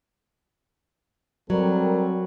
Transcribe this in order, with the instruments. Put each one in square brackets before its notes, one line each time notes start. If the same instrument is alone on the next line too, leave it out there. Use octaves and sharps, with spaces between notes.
[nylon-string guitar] F#3 [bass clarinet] G3 [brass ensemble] C4 A4 A#4